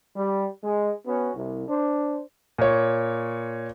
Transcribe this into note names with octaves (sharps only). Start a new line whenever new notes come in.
G3
G#3
B3 C#4 F#4
C2
D4 C5
A#2 C#5